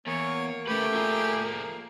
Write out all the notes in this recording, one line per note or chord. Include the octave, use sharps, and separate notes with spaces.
E2 A#3 C#5
C#3 A3 G4 B4
F3 G#4